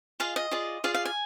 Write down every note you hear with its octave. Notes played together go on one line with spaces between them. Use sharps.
F4 G#4 D#5 F5
D#5
F4 G#4 D5
F4 G#4 D5 F5
F5
G#5